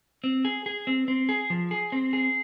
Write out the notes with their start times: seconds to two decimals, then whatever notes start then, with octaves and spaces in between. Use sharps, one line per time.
0.24 C4
0.45 G#4
0.66 G#4
0.87 C4
1.08 C4
1.29 G#4
1.50 F3
1.71 G#4
1.92 C4
2.13 G#4